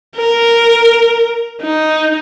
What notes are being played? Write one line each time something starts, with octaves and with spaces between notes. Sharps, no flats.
A#4
D#4